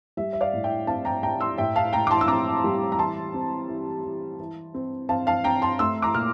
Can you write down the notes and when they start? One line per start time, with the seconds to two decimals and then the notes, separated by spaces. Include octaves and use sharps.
0.17 G3 E5
0.33 E5
0.41 D5 F5
0.53 A2
0.64 E5 G5
0.87 C4 F5 A5
1.05 G5 A#5
1.23 A2 G5 A#5
1.41 C6 E6
1.58 A2 E5 G5
1.76 F5 A5
1.93 A2 G5 A#5
2.07 D6
2.11 A5 C6
2.21 E6
2.28 C4 A#5 D6
2.64 G3
2.92 A#5
2.99 E3 A5 C6
3.34 C4
3.68 E3
4.04 E3
4.39 E3
4.74 C4
5.09 C4 F5 A5
5.27 F5 A5
5.44 C4 G5 A#5
5.62 A5 C6
5.79 A3 C6 E6
6.02 A#5 D6
6.14 A#2 F6